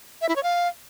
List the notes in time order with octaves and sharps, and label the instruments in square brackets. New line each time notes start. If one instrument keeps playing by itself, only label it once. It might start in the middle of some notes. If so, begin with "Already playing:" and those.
[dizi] E5
E4
C#5
F5